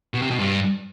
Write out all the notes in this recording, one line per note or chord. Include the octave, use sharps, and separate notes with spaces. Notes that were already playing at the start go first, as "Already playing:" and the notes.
B2
C3
B2
G2